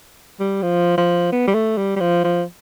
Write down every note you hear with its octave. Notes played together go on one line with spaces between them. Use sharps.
G3
F3
F3
B3
G3
A3
G3
G3
F3
F3